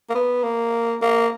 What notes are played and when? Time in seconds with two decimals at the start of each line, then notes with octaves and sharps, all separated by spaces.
0.09 A#3
0.14 B3
0.43 A#3
1.02 A#3